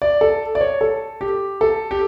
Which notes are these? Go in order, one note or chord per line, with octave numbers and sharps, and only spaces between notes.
D5
A4
D5
C#5
A4
G4
A4
G4